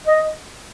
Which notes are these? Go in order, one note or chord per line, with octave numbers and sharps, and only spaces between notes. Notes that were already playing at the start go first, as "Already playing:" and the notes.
D#5